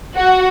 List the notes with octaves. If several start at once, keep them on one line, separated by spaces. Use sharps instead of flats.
F#4